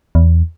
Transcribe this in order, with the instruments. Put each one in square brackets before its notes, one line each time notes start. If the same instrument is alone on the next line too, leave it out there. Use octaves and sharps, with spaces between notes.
[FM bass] E2